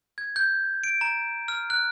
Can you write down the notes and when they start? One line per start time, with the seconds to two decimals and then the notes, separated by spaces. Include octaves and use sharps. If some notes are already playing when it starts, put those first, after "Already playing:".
0.18 G#6
0.36 G6
0.84 D7
1.01 A#5
1.48 F6
1.70 F#6